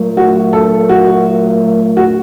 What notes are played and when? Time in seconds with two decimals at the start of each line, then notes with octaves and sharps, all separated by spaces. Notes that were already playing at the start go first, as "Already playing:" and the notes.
Already playing: A#2 F#3 A3
0.17 F#4
0.53 A4
0.89 F#4
1.97 F#4